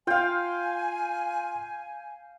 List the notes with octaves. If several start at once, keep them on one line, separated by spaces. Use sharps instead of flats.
F4 F5 G5 G#5